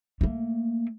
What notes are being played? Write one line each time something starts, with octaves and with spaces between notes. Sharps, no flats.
A3 A#3